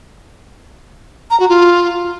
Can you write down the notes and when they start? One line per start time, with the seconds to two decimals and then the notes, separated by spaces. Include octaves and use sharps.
1.31 A#5
1.40 F#4
1.49 F4